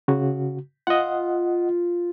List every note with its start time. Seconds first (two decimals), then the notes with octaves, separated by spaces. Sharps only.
0.08 C#3 F#4
0.87 F4 D#5 F#5